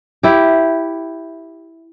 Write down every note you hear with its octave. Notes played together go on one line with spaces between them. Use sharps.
E4 G4